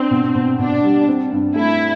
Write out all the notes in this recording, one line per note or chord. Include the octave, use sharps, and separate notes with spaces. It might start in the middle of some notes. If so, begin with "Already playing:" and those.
Already playing: C4 D4
B2
B2
B2 D4
G3
C4
G2
A3 E4